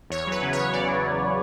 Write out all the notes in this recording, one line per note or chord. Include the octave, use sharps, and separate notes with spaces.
E2 C#5
F#3 B4
C#3
E2 C#5
E2 D5
F#3
C#3